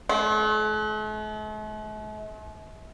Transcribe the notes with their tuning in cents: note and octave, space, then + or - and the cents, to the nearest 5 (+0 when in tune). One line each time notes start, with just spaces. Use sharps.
A3 -45